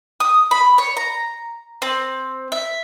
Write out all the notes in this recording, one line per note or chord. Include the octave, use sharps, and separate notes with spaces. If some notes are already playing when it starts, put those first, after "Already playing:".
D#6
B5
C#5
A#5
C4
E5